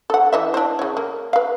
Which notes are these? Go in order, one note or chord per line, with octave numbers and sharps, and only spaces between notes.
A4 F#5
E3 D#5 E5
D4 E4 C5
C#3 C#5
A#3
B4 F5